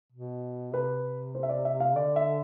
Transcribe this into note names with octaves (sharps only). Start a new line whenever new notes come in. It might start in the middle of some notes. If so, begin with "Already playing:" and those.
B2
C3 B4
C5
E5
D5
E5
F5
D3 D5
E5